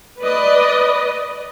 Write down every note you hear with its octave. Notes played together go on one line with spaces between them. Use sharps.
B4 D5 D#5